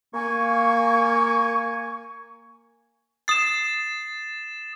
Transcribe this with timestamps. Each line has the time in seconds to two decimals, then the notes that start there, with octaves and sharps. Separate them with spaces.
0.14 A#3 G#5 C#6
3.28 D#6 A6 C7 E7